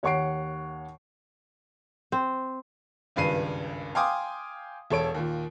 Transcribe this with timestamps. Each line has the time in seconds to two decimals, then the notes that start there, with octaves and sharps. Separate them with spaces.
0.03 D#2 C#5 F#5 C#6 C7 D7
2.12 C4
3.16 G#1 C#2 G2 B4 C7 D#7
3.95 F5 G5 G#5 C6 D6 D#6
4.90 E1 A4 C#5 D7
5.15 D#2 A#2